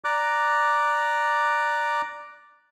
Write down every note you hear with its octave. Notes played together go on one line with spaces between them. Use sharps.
D5 A#5 D6 F#6